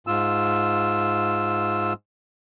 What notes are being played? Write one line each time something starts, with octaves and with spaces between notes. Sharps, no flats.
G#2 F4 E6